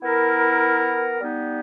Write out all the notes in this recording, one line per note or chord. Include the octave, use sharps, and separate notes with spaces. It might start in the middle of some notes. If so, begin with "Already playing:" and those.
B3 E4 A#4
G3 B3 D#4